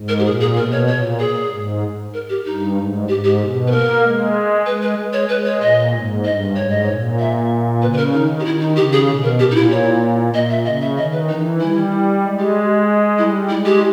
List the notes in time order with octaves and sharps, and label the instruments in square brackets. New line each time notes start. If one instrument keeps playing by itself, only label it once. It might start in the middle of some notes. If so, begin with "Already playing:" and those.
Already playing: [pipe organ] G#2
[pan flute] A#4
G4
[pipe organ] A#2 [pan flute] G#4
[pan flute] G#4
[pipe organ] B2 [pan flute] A#4
[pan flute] C#5
[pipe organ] A#2 [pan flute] C#5
[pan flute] G#4
[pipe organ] G#2
[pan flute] A#4
G4
[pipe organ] G2 [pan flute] D#4
[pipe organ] G#2
[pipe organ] G#2 [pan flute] G4
[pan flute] G4
[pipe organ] B2
[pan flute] B4
[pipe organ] A#3 [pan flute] A#4
[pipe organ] G#3
[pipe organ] G#3 [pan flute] B4
[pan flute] B4
[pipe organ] G#3
[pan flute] C#5
[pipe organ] G#3 [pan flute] B4
[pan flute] C#5
[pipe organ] A#2 [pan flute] D#5
[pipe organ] G#2
[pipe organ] G2 [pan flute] D#5
[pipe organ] G#2 [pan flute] C#5
[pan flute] D#5
[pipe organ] A#2 [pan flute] C#5
[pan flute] E5
[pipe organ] C#3 [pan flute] B4
[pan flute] B4
A#4
[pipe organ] D#3 [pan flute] D#4
[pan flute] G4
[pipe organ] D#3 [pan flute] E4
[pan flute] D#4
[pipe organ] C#3 [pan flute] G4
[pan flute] G#4
[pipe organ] B2
[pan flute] A#4
[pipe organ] A#2 [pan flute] G4
[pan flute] D#4
E4
C#5
[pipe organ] A#2 [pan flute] D#5
[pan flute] E5
[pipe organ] C#3 [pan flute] D#5
[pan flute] E5
[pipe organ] D#3 [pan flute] D#5
[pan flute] B4
[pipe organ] E3 [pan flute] D#4
[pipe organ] G3 [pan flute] E4
[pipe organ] G#3
[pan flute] G4
[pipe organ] G3 [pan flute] E4
[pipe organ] G#3 [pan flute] E4
[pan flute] G4